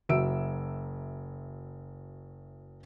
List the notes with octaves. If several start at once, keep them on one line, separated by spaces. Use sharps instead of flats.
F#1 F#3 E5 E6 D7